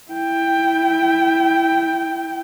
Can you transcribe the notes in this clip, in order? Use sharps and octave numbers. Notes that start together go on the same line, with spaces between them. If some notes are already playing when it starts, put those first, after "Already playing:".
E4 G5